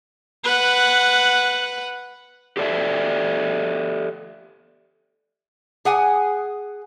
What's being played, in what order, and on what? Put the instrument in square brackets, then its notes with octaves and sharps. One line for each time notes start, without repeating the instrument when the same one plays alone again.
[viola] B4 F#5
[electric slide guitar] G4 A4 C5 D5 E5
[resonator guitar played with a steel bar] G#4 F#5 G#5